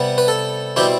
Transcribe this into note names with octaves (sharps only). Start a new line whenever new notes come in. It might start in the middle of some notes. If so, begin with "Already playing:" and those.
Already playing: C3 G3 B3 F#5
B4
A4
B2 G3 C4 E4 G4